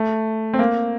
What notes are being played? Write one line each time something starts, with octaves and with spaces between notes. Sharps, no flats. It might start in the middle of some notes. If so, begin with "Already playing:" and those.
Already playing: A3
C4
A#3